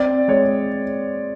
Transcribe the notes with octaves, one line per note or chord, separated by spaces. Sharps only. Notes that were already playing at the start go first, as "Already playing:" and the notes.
Already playing: C4 D5
G#3 C#5